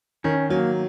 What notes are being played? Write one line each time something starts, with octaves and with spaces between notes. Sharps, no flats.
D#3 C#4
F#3 A#3